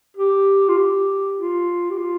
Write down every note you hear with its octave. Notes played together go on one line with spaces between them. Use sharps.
G4
F4
G4
F4
G4
F4